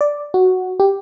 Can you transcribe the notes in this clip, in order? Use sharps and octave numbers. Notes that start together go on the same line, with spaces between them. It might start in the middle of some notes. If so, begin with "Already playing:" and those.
D5
F#4
G4